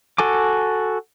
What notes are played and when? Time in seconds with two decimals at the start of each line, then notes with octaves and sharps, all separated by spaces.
0.18 F#4 A4 G#5 D6